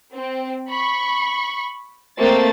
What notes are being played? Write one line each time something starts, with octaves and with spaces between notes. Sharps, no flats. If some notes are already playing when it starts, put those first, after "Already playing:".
C4
B5 C#6
A3 A#3 C4 C5 A6